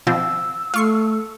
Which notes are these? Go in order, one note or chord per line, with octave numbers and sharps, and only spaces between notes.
B2 F3 C4 E6
A3 F4 C#6 C7